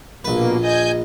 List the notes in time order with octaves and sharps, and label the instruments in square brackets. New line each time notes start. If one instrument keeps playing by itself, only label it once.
[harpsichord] A#1 B4 [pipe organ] B2 A#3
[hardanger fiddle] D#5 [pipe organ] G#5 G6